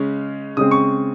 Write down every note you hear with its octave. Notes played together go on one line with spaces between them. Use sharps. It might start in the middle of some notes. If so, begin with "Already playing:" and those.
Already playing: C#3 G#3 C#4
C#3 G#3 C4 D#6
C#6